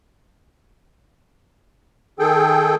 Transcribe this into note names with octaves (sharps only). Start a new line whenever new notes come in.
D#3 G#4 A4 G5